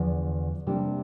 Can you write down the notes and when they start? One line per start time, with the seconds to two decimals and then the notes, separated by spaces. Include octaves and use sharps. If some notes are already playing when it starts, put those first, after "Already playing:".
Already playing: E2 D3 F3
0.67 C3 G3 A#3 D4